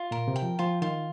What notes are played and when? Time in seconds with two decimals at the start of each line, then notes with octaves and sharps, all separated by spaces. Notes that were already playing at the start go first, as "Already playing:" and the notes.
Already playing: F4
0.11 A#2 A#4
0.28 C3
0.36 G5
0.42 F3
0.59 F3 F4
0.82 D#3 F4